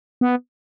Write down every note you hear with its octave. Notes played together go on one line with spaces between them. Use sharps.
B3